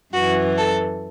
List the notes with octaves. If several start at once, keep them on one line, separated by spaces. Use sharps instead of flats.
F#2 E3 F#4
A4